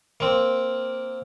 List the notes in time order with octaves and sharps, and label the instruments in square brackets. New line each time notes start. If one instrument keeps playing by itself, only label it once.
[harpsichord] A#3 C4